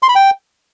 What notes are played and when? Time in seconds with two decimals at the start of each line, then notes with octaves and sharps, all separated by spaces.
0.03 C6
0.09 B5
0.15 G5